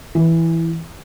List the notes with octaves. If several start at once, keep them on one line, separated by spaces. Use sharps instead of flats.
E3